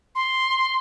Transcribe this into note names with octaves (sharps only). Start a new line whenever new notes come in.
C6